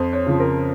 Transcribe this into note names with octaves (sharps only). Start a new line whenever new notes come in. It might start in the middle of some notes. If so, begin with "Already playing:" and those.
Already playing: F2 C5
C#5
C#3 F3
A#4